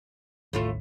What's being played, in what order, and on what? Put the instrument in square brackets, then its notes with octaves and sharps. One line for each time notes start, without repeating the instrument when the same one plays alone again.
[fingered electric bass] A1 D#2 [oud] A2 A3 F4